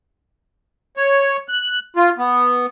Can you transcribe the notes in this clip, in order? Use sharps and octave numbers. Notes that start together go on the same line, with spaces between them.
C#5
F#6
F4
B3